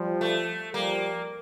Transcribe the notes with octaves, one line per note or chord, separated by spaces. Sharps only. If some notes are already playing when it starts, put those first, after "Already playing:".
Already playing: F3 G3
A3
F3 G3 A#3